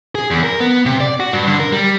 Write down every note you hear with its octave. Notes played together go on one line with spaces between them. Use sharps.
G#4
E2
A#4
B3
C3
D5
F#4
G2
D3
A#4
G3